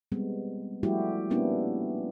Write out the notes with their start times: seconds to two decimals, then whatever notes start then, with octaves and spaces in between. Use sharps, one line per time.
0.12 G3 G#3 B3 C4
0.83 F3 G3 A3 E4 F#4 G4
1.30 G3 A#3 B3 C#4 D4 E4